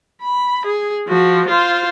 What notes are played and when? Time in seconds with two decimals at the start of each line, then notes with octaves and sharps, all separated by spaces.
0.22 B5
0.66 G#4
1.07 F3 F#4
1.49 F4 C5